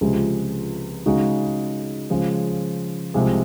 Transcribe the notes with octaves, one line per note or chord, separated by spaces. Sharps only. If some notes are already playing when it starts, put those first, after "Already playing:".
C#2 C3 F3 G#3
C#3 G#3 D#4 F#4
C#3 F3 G#3
C2 C3 F3 G#3